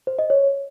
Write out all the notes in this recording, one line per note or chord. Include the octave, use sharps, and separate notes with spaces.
C5
D#5
C#5